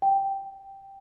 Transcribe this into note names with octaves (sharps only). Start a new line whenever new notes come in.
G5